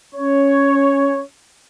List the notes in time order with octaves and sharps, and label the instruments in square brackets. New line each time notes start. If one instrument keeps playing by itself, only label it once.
[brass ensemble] C#4 C#5